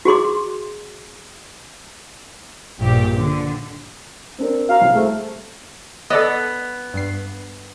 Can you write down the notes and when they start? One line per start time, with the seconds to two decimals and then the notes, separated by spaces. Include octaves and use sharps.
0.05 F#4 G#4 C6 D6
2.80 A#1 G2 G4
3.16 D3
4.38 C4 D4 A#4
4.69 F#4 F5 A#5
4.81 C2
4.95 A3 G#4 A4 C5
6.10 B3 A4 D5 D#5
6.94 G2 C7